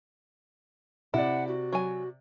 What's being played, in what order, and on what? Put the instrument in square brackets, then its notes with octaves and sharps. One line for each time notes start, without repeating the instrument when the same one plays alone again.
[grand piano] C3 D5 [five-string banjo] E4 [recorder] F#5
[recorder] F#4
[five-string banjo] F#3 G#5